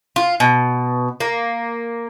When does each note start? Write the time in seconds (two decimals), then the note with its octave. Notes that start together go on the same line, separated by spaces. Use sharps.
0.16 F4
0.40 B2
1.20 A#3